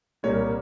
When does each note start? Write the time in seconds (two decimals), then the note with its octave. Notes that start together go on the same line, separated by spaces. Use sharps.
0.23 C2 A#2 G3 A#3 C#5